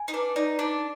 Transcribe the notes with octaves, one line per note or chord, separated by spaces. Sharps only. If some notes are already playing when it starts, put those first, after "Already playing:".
Already playing: G#5
D#4
D4 B4
D#4 D5
D4 D#4